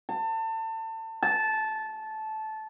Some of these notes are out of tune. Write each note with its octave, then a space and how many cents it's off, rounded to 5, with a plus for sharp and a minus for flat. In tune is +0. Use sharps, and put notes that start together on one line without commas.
A5 +30
A5 -15